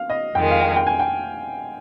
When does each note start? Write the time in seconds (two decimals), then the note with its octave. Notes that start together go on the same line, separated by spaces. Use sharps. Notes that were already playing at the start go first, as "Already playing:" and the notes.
Already playing: F5
0.10 D#5
0.35 F2 D#3 G#3 G5
0.51 F5
0.61 G5
0.76 G5
0.87 G#5
0.99 G5